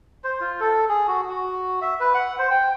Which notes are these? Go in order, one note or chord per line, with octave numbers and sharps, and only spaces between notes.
C5
F4
A4
G#4
F#4
F#4
E5
B4
F#5
C5
G5